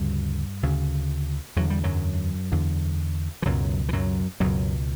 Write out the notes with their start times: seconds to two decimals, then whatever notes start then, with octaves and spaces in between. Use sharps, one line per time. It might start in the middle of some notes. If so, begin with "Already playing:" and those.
Already playing: D2 G2 C#3 G3
0.63 D2 C#3
1.56 E2 D3 F#3
1.70 G3
1.83 F#2 F#3
2.52 E2 D3
3.42 E3
3.45 C#2 F#2 B2 F#3
3.89 E3
3.93 F#2 F#3
4.40 C#2 F#2 B2 F#3